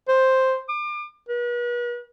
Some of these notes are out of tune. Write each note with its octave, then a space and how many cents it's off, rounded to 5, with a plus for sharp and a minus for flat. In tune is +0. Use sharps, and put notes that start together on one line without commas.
C5 +5
D6 +35
B4 -40